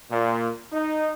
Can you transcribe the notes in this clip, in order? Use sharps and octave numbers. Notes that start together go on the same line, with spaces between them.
A#2
D#4